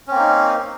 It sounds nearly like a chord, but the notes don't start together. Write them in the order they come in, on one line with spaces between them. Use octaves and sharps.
C#4 C4 A#3 D#4